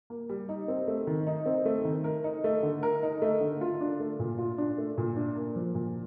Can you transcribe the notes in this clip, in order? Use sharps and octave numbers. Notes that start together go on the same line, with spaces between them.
A#3
G3
D#4
C4
A3
D#3
D#4
C4
A3
D#3
A#4
D#4
A3
D3
A#4
D#4
A3
D3
F4
D4
A3
A#2
F4
D4
A3
A#2
D4
A#3
F3
A#2